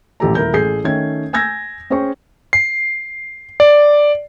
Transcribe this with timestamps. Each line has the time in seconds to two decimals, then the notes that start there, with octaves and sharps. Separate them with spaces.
0.20 D#1 A1 E3 G4 A4 A#5
0.35 D#1 E4 A#4 A#5 G6
0.53 A1 G#4 A4 G6 C7
0.84 D#3 A3 C#4 G5 G#6
1.33 G#5 E6 G6 G#6 A#6
1.90 C#4 G#4 C5 G5 C#6
2.53 C7
3.60 D5